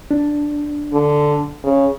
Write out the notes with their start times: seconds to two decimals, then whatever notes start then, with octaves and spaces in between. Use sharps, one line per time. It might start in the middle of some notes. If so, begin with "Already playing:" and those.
0.11 D4
0.93 D3
1.64 C#3